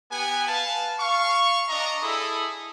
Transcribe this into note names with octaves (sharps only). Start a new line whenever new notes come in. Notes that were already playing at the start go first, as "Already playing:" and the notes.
B3 G4 F#5 G#5
B4 F5 A5
F5 C#6
D4 D#5 A#5
E4 G#4 A4 B5 D#6